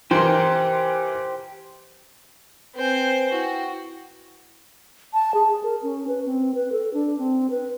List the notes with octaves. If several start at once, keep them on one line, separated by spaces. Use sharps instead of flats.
E3 G4 A#4 C5 C6
C4 B4 C5 G#5
E4 F#4 G5
A5
G#4
A#4
C#4
B4
C4
B4
A4
D4
C4
B4